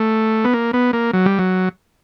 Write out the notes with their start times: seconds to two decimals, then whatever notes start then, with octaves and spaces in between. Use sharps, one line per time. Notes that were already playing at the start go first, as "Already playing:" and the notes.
Already playing: A3
0.44 B3
0.54 A#3
0.73 B3
0.93 A#3
1.13 F#3
1.26 G3
1.39 F#3